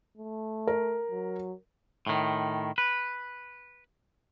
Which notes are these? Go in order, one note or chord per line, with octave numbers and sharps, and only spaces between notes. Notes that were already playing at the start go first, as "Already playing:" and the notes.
A3
A#4
F#3
A2 D#3
B4